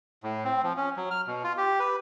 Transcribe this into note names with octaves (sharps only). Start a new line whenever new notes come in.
A2
C4
F3
C#4
F#3
F6
B2
F4
G4
B4